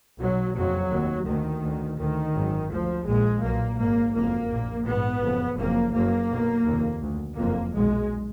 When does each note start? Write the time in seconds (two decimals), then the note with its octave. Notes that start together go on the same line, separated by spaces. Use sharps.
0.19 B1 B2 F#3
0.54 F#1 F2 F#3
0.91 F1 D#2
1.26 D2 D#3
1.63 D2
1.99 D2 D#3
2.34 G#1 F#2
2.71 D2 F3
3.06 A#1 A#2 G#3
3.42 B1 A#2 A#3
3.79 G#1 G#2 A#3
4.14 F#1 F2 A#3
4.50 A#1 A#2
4.86 A#1 G#2 B3
5.22 F#1 F2
5.58 F#1 F2 A#3
5.94 F#1 F#2 A#3
6.29 B1 B2
6.65 F1 D#2
7.02 D2
7.37 F#1 F2 A#3
7.74 B1 A#2 G#3